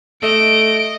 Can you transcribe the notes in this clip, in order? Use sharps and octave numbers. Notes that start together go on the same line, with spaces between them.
A3 D#5 D7